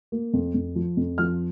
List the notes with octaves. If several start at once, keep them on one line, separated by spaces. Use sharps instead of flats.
A#3
F2
F2
F3
F2
F3 F6